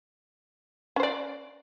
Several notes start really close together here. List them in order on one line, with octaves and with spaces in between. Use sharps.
C#4 C5 D5